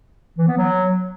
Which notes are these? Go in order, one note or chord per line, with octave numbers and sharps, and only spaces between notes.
E3
B3
F#3